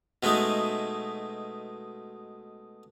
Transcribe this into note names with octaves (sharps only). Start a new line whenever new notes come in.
B2 G#3 A3 D#4